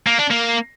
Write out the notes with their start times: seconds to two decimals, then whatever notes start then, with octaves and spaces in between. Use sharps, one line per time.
0.07 A#3
0.19 D4
0.30 A#3